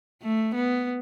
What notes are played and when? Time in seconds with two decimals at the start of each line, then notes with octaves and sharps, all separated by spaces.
0.22 A3
0.54 B3